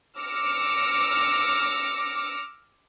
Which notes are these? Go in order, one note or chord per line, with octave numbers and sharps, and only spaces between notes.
D6 E6 F6 A#6 C#7